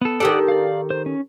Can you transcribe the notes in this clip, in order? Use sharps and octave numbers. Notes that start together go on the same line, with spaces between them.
B3 A4
D#3 G4 A4 D5 F#5 D#6
D5 F5
C5
C#4